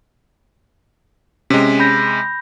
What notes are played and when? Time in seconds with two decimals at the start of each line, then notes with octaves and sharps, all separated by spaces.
1.50 C3 G#3 C#4
1.80 B5 G6 A#6